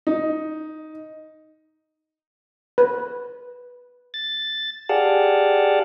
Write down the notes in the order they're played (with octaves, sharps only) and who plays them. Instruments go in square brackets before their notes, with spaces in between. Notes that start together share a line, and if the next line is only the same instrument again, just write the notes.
[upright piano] D#4
[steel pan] B4
[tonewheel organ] A6
G4 G#4 D5 F5 F#5 A5